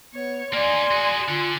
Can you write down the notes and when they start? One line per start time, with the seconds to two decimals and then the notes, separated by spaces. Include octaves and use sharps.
0.13 B3 C#5
0.53 A#3 D#4 D5 G#5 C6
0.91 F#4 G#4
1.28 D3 F4